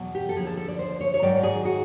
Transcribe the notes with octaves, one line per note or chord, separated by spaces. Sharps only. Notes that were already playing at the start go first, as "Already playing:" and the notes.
Already playing: E2 B2 F#3
G4
A4
D#2 D3 F3 G#4
A4
A4
D5
C5
C#5
C#5
G#2 D#3 F#3 D5
G#4
F#4